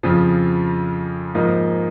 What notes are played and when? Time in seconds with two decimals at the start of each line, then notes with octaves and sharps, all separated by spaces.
0.03 F2 C#3 F3
1.35 G#2 F3 A#3 D#4